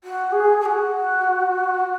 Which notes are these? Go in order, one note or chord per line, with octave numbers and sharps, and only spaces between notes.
F#4
G#4
G#4
F#4